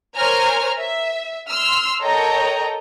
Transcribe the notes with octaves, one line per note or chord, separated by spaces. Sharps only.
A#4 C5 C#5 G#5 A#5 F6
E5
C6 E6 F6
A4 A#4 C#5 D#5 G5 A#5